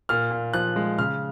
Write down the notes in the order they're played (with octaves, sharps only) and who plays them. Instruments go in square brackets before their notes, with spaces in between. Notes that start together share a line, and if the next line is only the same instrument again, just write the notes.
[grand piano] A#2 F6
A#2
F3 F#6
G#3
C#3 F6